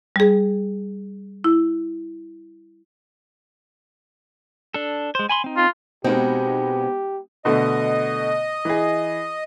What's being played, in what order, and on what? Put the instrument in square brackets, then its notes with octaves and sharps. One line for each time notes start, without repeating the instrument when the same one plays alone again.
[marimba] G3 G#4
E4
[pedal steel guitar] D4 A4
G#3 C5
G#5 B5 C6
C4 D#4
[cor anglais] F4
[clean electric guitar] B2 [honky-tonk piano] G#3 B3 D#4 [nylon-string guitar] C4 [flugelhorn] G4
[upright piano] B2 D3 A3 [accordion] D#5
[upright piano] E3 G#4